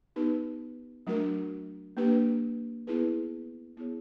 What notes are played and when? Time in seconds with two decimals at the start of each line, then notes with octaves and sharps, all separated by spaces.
0.16 B3 D#4 G4 B4
1.07 F#3 A3 D4 F#4 A#4
1.97 A#3 D4 G4 B4
2.87 B3 E4 G#4 B4
3.77 B3 E4 G#4 C#5